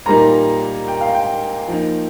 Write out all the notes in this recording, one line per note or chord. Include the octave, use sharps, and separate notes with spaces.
A#2 G3 A#3 D#4 A#5
G5
F5
G5
F3 A#3 D#4